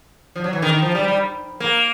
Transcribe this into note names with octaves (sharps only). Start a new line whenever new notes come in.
F3
F#3
E3
D#3
D#3
F3
G3
G3
A#3